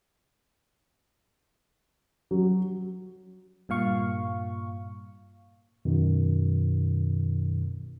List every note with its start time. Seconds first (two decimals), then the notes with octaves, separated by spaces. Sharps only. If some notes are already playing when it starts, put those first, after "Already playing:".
2.31 F#3
3.69 G2 A#2 F5 C#6
5.85 F#2 B2 D#3